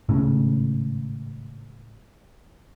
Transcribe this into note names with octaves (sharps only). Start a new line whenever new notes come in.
G#1 A2 C#3